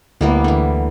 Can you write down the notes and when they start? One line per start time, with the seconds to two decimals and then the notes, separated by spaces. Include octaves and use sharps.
0.21 D2 G3 A#3 B3 E4
0.44 D3 E3